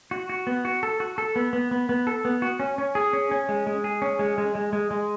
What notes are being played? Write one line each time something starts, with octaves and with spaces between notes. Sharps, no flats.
F#4
F#4
B3
F#4
A4
F#4
A4
B3
B3
B3
B3
A4
B3
F#4
C#4
C#4
G#4
C#4
C#4
G#3
G#3
G#4
C#4
G#3
G#3
G#3
G#3
G#3